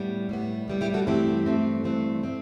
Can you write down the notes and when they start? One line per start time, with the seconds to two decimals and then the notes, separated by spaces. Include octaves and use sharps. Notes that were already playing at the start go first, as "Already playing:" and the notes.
Already playing: A2 G3 B3
0.29 A2 G3 B3
0.68 A2 G3 B3
0.81 E4 G4
0.94 F#4 A4
1.07 G2 E3 A3 C4 E4 G4
1.46 G2 E3 A3 C4
1.84 G2 E3 A3 C4
2.23 E3 A3 C4